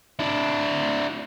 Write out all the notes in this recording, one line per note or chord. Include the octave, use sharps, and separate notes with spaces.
D4 E4